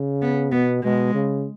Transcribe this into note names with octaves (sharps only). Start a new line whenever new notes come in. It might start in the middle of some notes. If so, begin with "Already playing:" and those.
Already playing: C#3
B3
B2 B3
B2 G#3
C#3